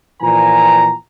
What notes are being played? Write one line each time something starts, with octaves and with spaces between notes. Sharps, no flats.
A#2 E3 F3 G#5 A#5